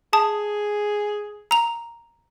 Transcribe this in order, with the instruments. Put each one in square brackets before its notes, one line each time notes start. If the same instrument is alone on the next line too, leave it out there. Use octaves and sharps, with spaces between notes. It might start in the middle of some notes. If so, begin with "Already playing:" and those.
[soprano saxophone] G#4 [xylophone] A5 D#6
[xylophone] A#5 F7